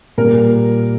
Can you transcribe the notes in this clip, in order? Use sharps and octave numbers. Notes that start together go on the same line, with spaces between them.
A#2 G3 A#3 A#4